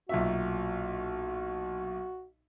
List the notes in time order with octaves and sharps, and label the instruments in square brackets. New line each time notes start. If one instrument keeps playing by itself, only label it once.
[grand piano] B1 A#2 E5 [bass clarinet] F#4